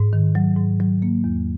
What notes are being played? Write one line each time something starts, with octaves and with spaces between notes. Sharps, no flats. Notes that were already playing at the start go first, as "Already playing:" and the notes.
Already playing: G#2
D#3
F#3
G#2
F#3
A#3
E2